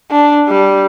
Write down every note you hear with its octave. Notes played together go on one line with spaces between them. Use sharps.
D4
G3